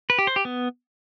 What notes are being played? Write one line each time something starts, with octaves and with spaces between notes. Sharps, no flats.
B4
G4
C5
G4
B3